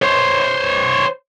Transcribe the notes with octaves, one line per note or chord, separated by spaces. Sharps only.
C5 C#5